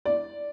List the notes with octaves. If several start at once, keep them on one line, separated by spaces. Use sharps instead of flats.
D5